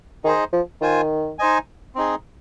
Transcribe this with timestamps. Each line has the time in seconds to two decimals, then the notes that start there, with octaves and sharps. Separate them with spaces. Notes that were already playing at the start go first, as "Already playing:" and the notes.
0.24 D#3 D#4 G#4 C5 D#5
0.53 F3
0.81 D#3 F4 C5 G#5
1.39 D#4 C5 D#5 G#5
1.95 C4 D#4 G#4